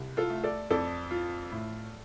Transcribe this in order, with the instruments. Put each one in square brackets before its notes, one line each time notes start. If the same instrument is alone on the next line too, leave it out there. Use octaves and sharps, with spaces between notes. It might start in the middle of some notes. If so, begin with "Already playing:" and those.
Already playing: [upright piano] C2
F4 A4
A3
A4 D5
F2 A4 D5
F4
A2